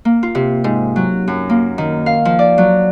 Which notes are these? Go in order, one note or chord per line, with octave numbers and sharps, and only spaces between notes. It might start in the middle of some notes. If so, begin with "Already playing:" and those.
A#3
F4
C3
G#2
F#3
F#2
A#3
D#3
F5
F3
D5
F#3